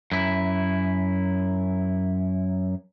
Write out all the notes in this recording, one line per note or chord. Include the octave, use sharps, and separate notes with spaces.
F#2 E4